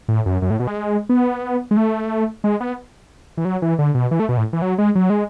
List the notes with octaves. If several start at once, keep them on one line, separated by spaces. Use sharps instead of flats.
A2
F#2
F#2
A2
B2
G#3
B3
G#3
A3
G#3
B3
E3
F#3
E3
D3
B2
E3
A3
B2
A2
E3
F#3
G#3
F#3
G#3